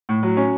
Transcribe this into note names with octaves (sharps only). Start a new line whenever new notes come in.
A2
F#3
C#4